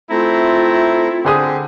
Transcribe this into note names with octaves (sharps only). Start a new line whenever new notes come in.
A3 C4 E4 F4 A#5
D3 C4 G4 G#4 C5 D#6